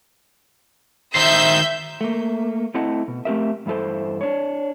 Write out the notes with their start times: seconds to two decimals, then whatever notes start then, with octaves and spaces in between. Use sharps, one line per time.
1.15 D#3 C5 E5 G6
2.01 A3 A#3
2.74 A3 C4 E4 D#5 F#5 A5
3.08 B2
3.25 A3 C4 G4 A#4 E5
3.66 E2 G2 E4 A4 C5
4.21 D4 C#5